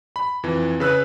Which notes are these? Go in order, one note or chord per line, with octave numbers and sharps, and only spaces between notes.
B5
F2 E3
C#3 B4 E6 F#6